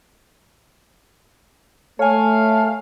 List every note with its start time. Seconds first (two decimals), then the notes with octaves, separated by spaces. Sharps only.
1.99 A3 A4 C#5 F5 G#5